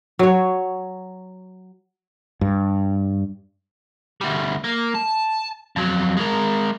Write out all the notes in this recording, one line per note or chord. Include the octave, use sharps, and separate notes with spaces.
F#3 C#5
G2
D2 G3
A#3
A5
F2 F#3
G#3 A#4